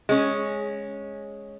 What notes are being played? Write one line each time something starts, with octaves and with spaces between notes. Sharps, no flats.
G#3 C#4